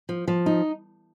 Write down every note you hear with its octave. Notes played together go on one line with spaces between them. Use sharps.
F3
F3
D#4